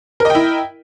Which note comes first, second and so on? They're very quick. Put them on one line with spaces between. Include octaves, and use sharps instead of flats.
A#4 D#5 G5 E4